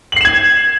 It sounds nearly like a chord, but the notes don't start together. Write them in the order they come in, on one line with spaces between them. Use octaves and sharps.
F#7 C7 E7 G#6